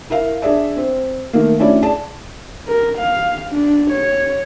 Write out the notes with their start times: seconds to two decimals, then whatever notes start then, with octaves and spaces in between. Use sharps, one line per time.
0.10 E4 A#4 E5 F5
0.42 D4 G#4 D5 E5
0.77 C4
1.33 D#3 A3 A#3
1.59 A3 C#4 D4 E4 F#4 D5
1.82 G#4 D5 A5
2.68 A#4
2.98 F5
3.50 D4
3.91 C#5